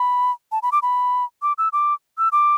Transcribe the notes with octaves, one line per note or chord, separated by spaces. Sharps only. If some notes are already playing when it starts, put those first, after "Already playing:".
Already playing: B5
A5
B5
D6
B5
D6
E6
D6
E6
D6